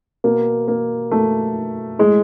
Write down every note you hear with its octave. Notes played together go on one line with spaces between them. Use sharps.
B2 A#3
A#3
B2 A3
A2 G#3